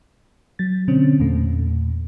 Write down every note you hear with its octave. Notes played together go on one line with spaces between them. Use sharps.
F#3 A6
B2 D3 C4 C#4
E2 A#2 A3